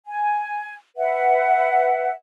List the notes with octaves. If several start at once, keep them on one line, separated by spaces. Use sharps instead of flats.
G#5
B4 E5 F#5